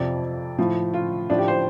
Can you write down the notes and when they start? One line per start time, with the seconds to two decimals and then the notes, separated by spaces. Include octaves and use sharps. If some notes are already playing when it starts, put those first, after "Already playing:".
Already playing: F2 C3 F3 D5
0.58 A2 F3
0.94 F4
1.30 A2 F3 D4
1.38 G4
1.48 C5